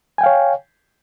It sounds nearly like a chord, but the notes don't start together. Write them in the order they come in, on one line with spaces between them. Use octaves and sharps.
G#5 G5 F5 C#5